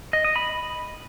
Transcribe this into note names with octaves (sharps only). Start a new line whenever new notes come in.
D#5
D#5
B5